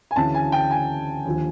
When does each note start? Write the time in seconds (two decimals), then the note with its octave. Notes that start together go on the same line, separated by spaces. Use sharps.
0.11 G#5
0.16 D2 C#3 E3 A5
0.35 G#5
0.52 G5
0.71 G#5
1.25 D#2 D3 F3